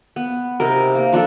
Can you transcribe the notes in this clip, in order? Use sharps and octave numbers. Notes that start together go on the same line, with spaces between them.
B3
C3 D#4 A#4
A#3
F3 D4 F4 A4